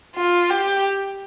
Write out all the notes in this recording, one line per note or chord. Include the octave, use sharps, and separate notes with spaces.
F4
G4